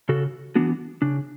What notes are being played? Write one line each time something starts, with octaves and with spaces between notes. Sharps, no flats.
C#3 F#4 A4
E3 B3 D4 F#4
C#3 D4